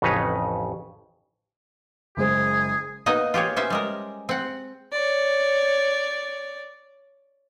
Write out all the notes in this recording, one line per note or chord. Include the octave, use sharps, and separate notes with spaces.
A1 F2 C#3 D#4 B4 C#5
F#1 G#3 G#4 C5
A#3 B3 D#4 D#5
F4 G4 G#4 C#5
B3 C#4 C5 E5
G3 G#3 A#4
C4 F#5
C#5 D5